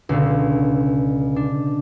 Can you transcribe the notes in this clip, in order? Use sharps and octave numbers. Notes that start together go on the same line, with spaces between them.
C#2 B2 D3
D4